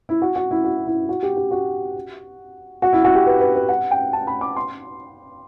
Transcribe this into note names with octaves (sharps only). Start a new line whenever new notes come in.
E4
F#4
F#4
E4
F#4
E4
F#4
G4
G4
F#4
F#4
E4
F#4
G4
B4
B4
B4
F#5
G5
A5
B5
D6
C6